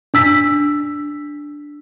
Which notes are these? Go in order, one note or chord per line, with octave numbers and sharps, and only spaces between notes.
D4 E6 B6